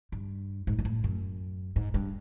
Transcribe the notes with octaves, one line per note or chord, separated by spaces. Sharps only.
G2
G#2
A#2
A2
F#2
G#2
G2